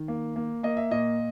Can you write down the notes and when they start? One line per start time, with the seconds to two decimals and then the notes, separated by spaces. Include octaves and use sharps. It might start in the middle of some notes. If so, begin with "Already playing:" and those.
Already playing: D#3
0.08 A#3
0.36 A#3
0.63 A#3 D#5
0.77 E5
0.91 A#2 D#5